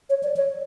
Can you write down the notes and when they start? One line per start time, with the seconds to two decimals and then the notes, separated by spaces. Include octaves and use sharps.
0.10 C#5
0.23 D5
0.36 C#5